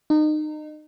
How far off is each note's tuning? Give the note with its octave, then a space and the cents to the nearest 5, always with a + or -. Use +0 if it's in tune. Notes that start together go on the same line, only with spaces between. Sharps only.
D#4 -30